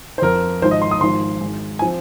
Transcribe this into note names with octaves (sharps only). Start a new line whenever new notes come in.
C5
F2 F3 C4 A#4
G#1 G#2 F3 C5
D#5
C6
D#6
G#1 G#2 F3 C6
G#1 G#2 G#3
G#5
F3 C4